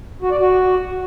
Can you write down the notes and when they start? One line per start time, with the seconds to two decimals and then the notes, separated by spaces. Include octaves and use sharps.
0.22 F#4
0.31 D5
0.40 F#4